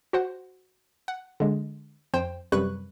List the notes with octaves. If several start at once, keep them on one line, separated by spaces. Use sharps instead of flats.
F#4 C5 F#5
F#5
D3 G#3
F2 C5 G5
F#2 C3 G3 B4 C#6 F#6